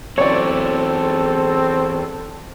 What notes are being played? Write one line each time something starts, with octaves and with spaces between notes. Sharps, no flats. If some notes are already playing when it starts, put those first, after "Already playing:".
E2 E3 F#3 C4 A4 C#5 D5